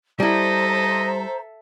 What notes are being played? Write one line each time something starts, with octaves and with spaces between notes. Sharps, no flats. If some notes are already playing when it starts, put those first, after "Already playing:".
G3 E4 A4 C5 D#5 E5 A#5